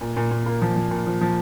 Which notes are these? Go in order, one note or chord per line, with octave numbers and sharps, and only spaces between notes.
A#2
A#2
A#2
A#3
F3
F3
A#2
F3
F3